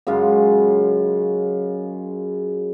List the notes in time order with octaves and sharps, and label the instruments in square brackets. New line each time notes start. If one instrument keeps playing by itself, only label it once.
[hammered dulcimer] F#2 C#3 G#3 F4